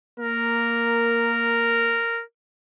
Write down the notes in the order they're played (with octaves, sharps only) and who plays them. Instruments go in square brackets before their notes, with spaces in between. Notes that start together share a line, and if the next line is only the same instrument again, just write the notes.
[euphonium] A#3 [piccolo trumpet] A#4